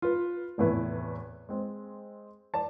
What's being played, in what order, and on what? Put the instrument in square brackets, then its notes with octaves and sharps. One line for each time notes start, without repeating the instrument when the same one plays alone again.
[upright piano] F4 B4
F1 E2 A2 E4 B4
G#3 C4
D5 A5